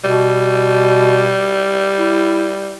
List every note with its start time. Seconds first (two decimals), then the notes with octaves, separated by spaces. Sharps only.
0.04 B2 G3
1.97 E4